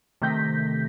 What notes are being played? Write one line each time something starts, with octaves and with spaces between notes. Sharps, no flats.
C3 D#3 A3 G6 A#6 B6